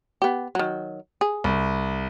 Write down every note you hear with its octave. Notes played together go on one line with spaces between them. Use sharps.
B3 G4
D#3 F#3
G#4
C2